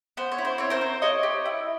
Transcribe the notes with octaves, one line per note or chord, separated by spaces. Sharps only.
B3 C5
C#5
E4
C5
C4 C#5
A#4 C5
C4
G4 C#5 D#5
G4
E4